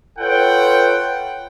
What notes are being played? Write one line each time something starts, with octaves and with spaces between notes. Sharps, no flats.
F4 A4 B4 C#5 F#5 G5